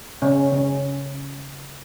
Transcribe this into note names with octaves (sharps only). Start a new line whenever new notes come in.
C#3 C#4
C#3 C#4